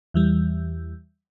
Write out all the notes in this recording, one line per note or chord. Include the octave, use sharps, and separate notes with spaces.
E2 E3 G3